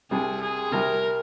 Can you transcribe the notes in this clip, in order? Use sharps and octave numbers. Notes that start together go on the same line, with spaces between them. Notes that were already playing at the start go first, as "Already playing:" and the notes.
C2 C3 G3 G#4
G#4
C2 C3 G3 A#4